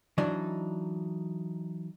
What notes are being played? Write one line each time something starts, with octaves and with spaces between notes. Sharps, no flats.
E3 F#3 D4 D#4